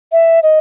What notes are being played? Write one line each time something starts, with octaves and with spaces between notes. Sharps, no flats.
E5
D#5